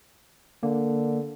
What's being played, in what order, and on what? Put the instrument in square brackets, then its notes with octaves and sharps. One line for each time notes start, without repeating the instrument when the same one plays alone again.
[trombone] D3 [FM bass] A#3